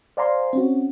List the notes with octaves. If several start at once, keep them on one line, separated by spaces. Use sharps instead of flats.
C5 D5 F5 G#5 A#5 C6
C4 C#4 F#4